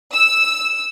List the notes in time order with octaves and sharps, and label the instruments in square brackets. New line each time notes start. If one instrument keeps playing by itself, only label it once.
[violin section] E6